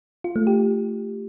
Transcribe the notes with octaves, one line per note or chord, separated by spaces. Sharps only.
F4
A3
G4